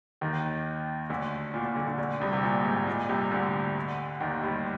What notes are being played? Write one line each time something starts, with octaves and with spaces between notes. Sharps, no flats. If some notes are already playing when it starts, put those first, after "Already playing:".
D#2 D#3
D2 D3
A#2
A#2
D2 D3
D2 D3
D2 D3
C2 C3
C3
A#2
G#2
A#2
C2 C3
D2 D3
D#2 D#3
G2 G3